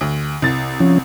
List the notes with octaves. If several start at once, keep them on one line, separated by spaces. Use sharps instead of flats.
D2
C2 A6
F3 C#4